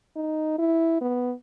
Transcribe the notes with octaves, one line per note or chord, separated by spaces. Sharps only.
D#4
E4
B3